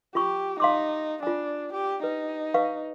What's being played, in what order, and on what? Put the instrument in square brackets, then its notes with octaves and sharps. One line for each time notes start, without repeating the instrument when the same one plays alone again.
[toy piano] F4 B5 C#6 [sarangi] G4
[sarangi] D#4 [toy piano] F5 C6 D6
[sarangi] D4 [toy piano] F4 G#5
[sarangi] G4
[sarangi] D#4 [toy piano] B4
[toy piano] B4 F5 C#6